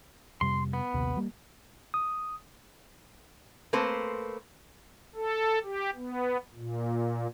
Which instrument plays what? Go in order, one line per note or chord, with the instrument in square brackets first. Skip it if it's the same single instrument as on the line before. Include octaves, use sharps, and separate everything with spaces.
[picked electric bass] F2 C3 G3 [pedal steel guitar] C6
[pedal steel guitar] B3
[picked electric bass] A#1 D#2 C3
G3 A#3
[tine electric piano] D#6
[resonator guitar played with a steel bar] A3 A#3 C4 B4 C5
[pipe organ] A4
G4
B3
A#2